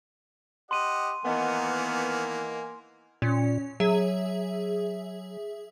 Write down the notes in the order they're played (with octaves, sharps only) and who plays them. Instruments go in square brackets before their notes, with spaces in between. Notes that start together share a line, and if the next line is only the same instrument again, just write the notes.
[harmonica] G4 D#5 F#5 [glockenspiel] C6 D#7
[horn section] D#3 B3 [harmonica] E3 A#3 G#5 [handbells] A#4 D#5 F#5
[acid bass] A#2 [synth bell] C#4
[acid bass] F#3 [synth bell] G#4 E5